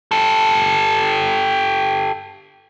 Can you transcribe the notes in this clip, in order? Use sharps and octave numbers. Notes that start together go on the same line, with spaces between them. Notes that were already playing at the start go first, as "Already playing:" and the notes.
G4 A4